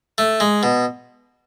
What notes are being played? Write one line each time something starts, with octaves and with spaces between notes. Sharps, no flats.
A3
G#3
B2